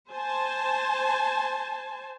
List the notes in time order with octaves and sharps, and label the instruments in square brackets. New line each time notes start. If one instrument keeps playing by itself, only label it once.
[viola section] C5 G#5 A5